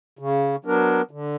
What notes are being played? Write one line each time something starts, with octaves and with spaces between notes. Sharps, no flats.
C#3
F#3 B3 D4 A#4
D3